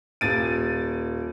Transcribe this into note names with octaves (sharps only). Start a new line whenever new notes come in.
D#1 A6 D#7